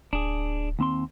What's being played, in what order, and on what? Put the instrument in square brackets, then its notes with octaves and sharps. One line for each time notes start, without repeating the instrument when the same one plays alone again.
[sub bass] D1 [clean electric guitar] D4 G#4
[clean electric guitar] D#2 C4 C6